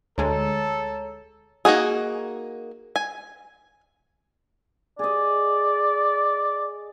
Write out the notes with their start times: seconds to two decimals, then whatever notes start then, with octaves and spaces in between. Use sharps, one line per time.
0.18 D2 G#3 A4 C#5 A5 A#5
1.65 A#3 D#4 F#4 G#4
2.96 G#5
4.99 G#4 D5 D#5